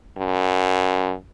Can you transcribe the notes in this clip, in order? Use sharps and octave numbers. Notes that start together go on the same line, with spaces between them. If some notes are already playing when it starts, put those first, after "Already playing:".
F#2